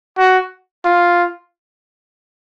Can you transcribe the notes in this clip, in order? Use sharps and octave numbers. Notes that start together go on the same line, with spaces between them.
F#4
F4